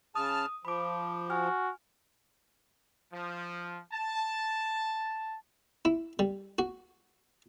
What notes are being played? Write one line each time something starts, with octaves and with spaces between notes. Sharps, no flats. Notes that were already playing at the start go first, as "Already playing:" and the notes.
C#3 A5 D#6 F6
F3 B5 D6
F#4 G#5 F6
F3
A5
E4
G3
F#4